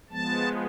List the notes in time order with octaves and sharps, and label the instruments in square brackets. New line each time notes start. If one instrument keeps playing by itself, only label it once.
[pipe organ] F3 G#3 B3 A5